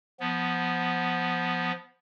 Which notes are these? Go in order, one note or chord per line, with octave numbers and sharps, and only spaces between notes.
F3 B3